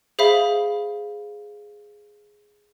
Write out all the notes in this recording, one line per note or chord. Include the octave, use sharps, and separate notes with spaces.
G#4 C5 E5 F5 B5